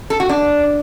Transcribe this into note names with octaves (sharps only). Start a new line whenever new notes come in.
A4
F#4
D4